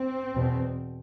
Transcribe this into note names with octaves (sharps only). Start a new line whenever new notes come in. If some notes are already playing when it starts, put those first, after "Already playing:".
Already playing: C4
E2 B2